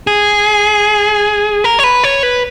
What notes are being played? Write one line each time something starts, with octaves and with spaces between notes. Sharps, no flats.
G#4
A#4
C#5
B4
C#5
B4